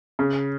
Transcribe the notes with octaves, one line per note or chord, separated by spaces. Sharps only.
C#3